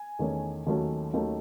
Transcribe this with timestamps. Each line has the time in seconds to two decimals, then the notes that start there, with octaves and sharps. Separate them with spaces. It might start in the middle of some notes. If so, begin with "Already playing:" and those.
Already playing: G#5
0.19 E2 D#3 A3 C#4
0.67 D#2 D#3 F#3 A3 C#4
1.13 D#2 D#3 F#3 A3 C#4